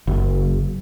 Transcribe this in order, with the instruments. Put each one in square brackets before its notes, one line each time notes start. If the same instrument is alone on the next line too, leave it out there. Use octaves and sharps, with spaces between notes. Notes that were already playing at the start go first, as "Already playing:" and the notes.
[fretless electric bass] F#1